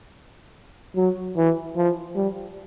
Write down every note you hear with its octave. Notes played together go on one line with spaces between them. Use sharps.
F#3
E3
F3
G3